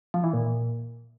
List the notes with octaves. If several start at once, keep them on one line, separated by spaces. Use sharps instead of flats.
F3
E3
A#2